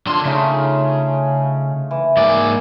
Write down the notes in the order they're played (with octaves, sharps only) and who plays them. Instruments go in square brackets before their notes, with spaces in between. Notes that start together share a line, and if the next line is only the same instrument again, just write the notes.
[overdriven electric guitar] D3 C6 [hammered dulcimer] D4 F4 C#5
[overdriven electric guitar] C#3 [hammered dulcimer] A3 D#4
[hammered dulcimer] E3
[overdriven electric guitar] G#2 D5 [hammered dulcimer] A#3